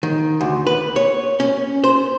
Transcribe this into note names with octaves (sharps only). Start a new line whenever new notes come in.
D#3
D2
B4
C#5
C#4
C5